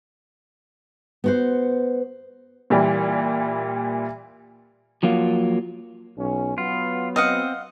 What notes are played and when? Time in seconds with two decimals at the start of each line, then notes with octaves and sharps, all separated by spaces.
1.24 B3 F#4 C5
2.70 A#2 E3 G3
5.03 F3 F#3 A#3 F4
6.18 B1 C#4
6.58 F#3 B3 F4
7.16 C4 D#5 F5 F#5